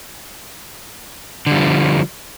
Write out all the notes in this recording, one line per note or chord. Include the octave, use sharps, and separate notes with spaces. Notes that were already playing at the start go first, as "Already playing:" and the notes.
D3 F3 G3